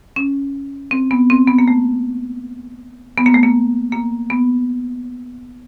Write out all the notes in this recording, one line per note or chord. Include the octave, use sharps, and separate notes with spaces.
C#4
C4
B3
C4
B3
A#3
A3
B3
A#3
A3
A#3
A#3
B3